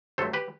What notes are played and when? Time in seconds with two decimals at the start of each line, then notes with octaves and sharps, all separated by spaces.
0.18 G2 F#3 A3 A4 C5
0.33 G4 B4